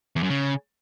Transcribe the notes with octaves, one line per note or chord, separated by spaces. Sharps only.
E2
F#2
C#3